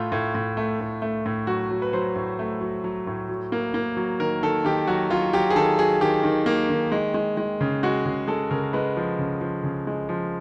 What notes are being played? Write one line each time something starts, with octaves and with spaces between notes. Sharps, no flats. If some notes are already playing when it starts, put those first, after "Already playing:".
Already playing: A2 A3 F4
A2
A2
A3
A2
A3
A2
F#3 F#4
F#3
B4
F#3 C5
A2
A3
F#3
F#3
A2
F#3
A#3
A#3
F#3
D#3 A#4
D#3 A4
D#3 G4
F#3 F#4
F#3 F4
F#3 G4
G#4
D#3 A4
F#3 G#4
D#3 G4
D#3
A#3
D#3
G#3
G#3
G#3
C#3
G#3 F#4
C#3 G#4
G#3 A4
C#3 A#4
G#3 B4
F3
C#3
F3
C#3
G#3
F3